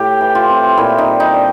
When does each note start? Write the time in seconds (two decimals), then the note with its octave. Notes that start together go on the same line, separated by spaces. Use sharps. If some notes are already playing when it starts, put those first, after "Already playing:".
Already playing: A2 G4
0.21 E3
0.35 F4
0.50 C4
0.77 A#2 E4
0.98 D#4
1.06 G3
1.20 D#4
1.34 D4